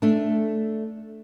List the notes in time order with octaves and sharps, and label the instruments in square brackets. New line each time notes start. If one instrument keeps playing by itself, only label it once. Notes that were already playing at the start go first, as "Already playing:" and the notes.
[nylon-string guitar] A3 D4